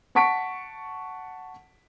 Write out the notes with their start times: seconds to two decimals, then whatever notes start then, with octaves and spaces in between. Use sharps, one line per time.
0.15 F#5 A5 C#6 B6 D7